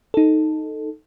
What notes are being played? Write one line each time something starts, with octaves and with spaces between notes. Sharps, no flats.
D#4 A4